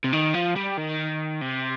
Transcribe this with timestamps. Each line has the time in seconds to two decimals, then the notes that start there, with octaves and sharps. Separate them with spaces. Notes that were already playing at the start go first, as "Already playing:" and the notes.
0.04 C3
0.13 D#3
0.34 F3
0.56 G3
0.77 D#3
1.41 C3